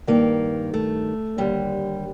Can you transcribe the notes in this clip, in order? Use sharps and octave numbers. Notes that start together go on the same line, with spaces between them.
G2 D#3 A#3
A3
D#2 D3 G3